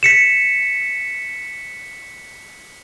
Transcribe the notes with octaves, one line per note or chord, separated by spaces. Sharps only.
B6 C#7 E7